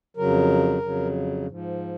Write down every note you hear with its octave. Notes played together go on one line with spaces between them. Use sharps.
F2 C#3 F#3 A#4
F2 C#3 F#3
G#2
F3